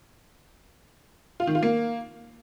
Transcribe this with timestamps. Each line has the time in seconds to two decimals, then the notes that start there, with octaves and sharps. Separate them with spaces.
1.40 F4
1.47 D#3
1.55 F4
1.63 A#3